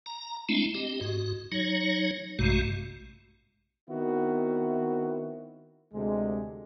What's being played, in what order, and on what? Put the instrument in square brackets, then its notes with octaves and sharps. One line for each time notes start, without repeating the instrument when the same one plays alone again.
[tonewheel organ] A#5
G#3 A3 C4 D4 E4
C4 G4 D#5
G#2 F#4
F#3 D#4 C#5
A#1 G2 C3 G#3 A3 F#4
[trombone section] D#3 B3 C4 E4 F#4
D2 C3 G#3